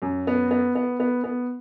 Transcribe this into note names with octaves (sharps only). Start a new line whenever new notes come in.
F#2
B3
B3
B3
B3
B3